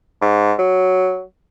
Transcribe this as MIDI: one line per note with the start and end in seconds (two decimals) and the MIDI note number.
0.22 0.53 44
0.59 1.21 54